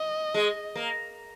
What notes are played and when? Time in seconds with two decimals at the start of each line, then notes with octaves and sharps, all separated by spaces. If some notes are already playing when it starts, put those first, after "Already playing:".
Already playing: D#5
0.34 G#3
0.75 A#3